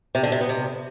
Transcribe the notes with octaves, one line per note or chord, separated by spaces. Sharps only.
C3
D3
C3
B3
C3